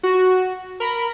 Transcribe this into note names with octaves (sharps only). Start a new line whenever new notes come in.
F#4
A#4 B5